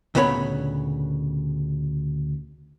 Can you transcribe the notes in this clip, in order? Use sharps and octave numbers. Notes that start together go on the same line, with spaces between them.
D2 A#2 C#3 B3 C#5 B5